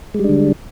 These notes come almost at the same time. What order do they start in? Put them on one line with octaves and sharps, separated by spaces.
G#3 G3 D4 D3